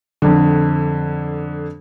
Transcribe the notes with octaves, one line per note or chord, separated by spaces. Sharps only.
F2 D3